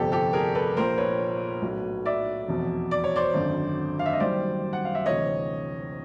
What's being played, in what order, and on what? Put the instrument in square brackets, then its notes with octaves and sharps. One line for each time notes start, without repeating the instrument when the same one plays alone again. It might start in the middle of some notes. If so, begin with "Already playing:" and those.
Already playing: [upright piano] G1 F2 C3 G4 A4
G4 A4
G#4 A#4
A4 B4
A#1 A#2 F3 A#4 C5
B4 C#5
B1 A2 F#3
D5 E5
F1 E2 B2
D5
C#5
C5 D5
G#1 F#2 D3
F5
E5
D#5
F#1 F#2 D#3 G3 C5 D5
F#5
F5
E5
D2 C3 E3 C#5 D#5